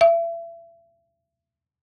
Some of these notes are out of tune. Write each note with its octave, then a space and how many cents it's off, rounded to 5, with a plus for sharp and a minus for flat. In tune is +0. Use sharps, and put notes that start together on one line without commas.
E5 +35